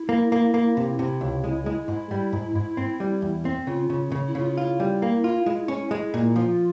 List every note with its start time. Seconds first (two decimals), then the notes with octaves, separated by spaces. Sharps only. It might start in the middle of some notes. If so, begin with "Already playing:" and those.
Already playing: E4
0.09 A#3
0.32 A#3
0.54 A#3
0.77 C3
0.99 C3 E4
1.21 C#2
1.44 G#3
1.66 G#3
1.88 G#2 E4
2.11 G3
2.33 G#2
2.55 G#2
2.77 C4
3.00 G3
3.22 E2
3.45 C4
3.67 C#3 F4
3.90 C#3
4.12 C#3
4.27 E4
4.35 C#3 F4
4.51 E4
4.57 F4
4.80 G3
5.02 A#3
5.24 F4
5.46 G#3
5.68 C#4
5.91 G#3
6.14 A#2
6.35 F3 F4